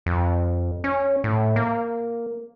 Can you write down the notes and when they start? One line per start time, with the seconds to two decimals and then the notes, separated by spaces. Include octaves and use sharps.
0.06 F2
0.84 C#4
1.24 A2
1.56 A#3